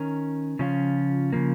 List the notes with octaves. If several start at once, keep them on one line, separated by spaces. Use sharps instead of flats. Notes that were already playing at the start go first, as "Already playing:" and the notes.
Already playing: D#3 C#4 A#4
C#3 F3 C#4 F4
C#3 F3 A#3